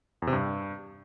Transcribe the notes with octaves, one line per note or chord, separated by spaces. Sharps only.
E2
C3
G2